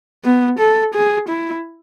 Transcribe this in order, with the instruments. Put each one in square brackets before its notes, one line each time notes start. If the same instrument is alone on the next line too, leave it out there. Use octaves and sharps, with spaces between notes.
[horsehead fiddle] B3
A4
G#4
E4